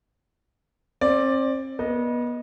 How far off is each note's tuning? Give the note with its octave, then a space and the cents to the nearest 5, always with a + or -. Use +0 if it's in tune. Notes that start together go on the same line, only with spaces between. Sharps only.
C4 +35 D5 +5
B3 -30 D#5 +0